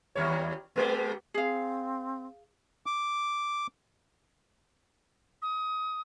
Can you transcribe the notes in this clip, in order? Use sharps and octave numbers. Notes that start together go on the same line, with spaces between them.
D#2 G3 C#5
G3 G#3 B3
C4 G#4 F5
D6
D#6